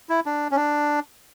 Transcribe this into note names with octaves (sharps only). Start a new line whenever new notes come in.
E4
D4
C#4
D4